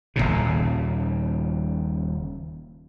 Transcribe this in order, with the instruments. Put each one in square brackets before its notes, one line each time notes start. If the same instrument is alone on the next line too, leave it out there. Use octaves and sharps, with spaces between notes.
[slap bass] D#1 G#1 A#2 C#3